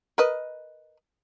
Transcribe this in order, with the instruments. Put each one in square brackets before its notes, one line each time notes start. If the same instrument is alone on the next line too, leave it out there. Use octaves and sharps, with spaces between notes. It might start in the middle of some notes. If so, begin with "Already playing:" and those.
[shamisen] A#4 B4 D#5